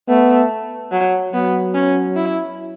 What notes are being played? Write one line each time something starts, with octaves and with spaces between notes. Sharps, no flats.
A3 B3
F#3
F#3 B3
C#4
E4